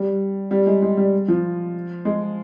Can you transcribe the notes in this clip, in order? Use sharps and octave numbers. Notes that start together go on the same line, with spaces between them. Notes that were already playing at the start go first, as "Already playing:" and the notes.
Already playing: G3
G3
G#3
G#3
G3
F3
G#3